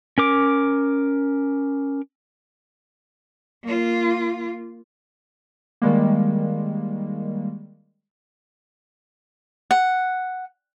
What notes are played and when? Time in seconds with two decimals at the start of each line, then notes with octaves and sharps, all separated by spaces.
0.18 C#4 A#4 D6
3.64 A#3 F4
5.82 D#3 G3 G#3 A#3
9.71 F#5